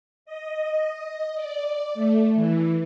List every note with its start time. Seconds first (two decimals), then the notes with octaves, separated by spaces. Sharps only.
0.25 D#5
1.35 D5
1.94 A3
2.35 E3